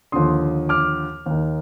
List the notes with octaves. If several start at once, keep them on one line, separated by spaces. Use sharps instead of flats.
D#2 D3 F3 C6 D#6
D6 F6
D#2 D#3